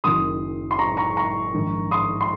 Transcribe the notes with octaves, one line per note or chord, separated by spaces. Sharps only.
F#1 F#2 D#3 C6 D#6
C6
A#5 C#6
A#5 C#6
A#5 C#6
A#1 G#2 D#3
C6 D#6
C6